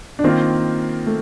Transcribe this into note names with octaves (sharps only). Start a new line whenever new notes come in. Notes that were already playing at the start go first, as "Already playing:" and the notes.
D4
D#3 A#3 C4 F4
A3